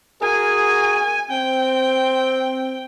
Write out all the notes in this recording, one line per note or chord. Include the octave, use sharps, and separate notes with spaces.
F#4 G#4 A#4 G#5
C4 G5